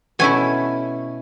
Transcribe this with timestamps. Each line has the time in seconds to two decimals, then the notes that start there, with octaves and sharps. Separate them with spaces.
0.19 B2 A3 C#4 E4 G#5